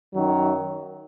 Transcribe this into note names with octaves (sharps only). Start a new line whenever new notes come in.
F#2 D#3 F#3